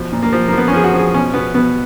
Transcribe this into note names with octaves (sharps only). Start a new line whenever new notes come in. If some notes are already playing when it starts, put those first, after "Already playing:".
Already playing: B2 F3
A#2
A#3
F3
F3 A#3
B3
C#4
F3 G#4
F#4
F3
G#4
B2 C#4
B2 B3
B2 B3